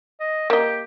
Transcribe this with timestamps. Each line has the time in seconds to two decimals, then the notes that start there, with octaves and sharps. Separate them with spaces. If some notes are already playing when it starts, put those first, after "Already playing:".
0.20 D#5
0.50 A#3 G4 D#5